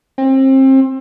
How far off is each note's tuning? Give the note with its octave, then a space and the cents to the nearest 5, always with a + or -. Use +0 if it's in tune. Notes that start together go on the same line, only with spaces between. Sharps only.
C4 +30